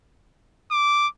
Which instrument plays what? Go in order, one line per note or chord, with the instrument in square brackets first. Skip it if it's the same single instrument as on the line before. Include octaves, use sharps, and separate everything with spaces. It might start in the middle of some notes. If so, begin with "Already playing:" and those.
[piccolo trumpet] D6